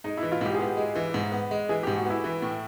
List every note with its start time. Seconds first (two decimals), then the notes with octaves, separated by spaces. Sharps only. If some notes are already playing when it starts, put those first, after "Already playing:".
0.04 G#3 D#4
0.17 E4
0.23 E3
0.32 F4
0.41 G#2 G4
0.54 G#4
0.59 B3 G4
0.77 G#3
0.95 E3
1.14 G#2
1.32 B3
1.51 G#3
1.69 E3 G#4
1.83 G#2 G4
1.96 F#4
2.05 B3 E4
2.24 E3
2.42 A2